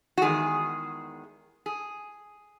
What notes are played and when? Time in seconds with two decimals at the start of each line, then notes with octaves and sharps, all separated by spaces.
0.18 F#4
0.22 E2 D#3 G#3 G#4
1.66 G#4